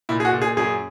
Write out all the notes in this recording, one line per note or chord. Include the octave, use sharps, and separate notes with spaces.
A#2 E4
G#4
F#4
A#2
G#4
F#2 G#4